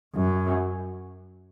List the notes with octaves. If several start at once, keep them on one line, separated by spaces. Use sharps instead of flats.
F#2